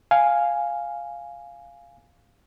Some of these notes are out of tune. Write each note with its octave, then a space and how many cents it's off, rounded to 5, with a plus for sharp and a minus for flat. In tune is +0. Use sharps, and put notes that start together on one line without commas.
F5 +0 G#5 +0